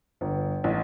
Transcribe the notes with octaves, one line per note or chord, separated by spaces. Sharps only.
G1
A1